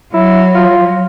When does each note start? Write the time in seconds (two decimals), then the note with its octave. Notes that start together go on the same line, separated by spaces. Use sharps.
0.13 F#3 E4
0.55 F4